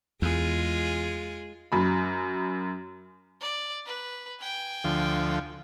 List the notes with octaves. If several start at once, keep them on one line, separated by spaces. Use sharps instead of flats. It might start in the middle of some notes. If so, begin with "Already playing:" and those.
E2 G#3 F4 G#4
F#2 B5
D5
B4
G5 G#5
D2 F3